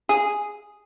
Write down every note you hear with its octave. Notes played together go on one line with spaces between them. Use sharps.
G#4